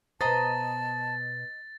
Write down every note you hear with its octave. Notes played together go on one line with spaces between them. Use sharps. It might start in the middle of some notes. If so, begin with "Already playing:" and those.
B2 C5 D#5 A5 A#5 A6